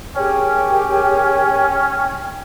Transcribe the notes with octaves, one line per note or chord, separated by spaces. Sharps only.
C#4 G4 G#4 A#4 C#5 G5